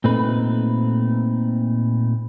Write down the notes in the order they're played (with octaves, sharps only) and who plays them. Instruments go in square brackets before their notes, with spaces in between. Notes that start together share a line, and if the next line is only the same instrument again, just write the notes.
[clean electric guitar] A#2 A3 C4 D#4 B4